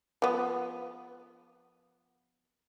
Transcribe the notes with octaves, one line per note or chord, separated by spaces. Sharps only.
F3 B3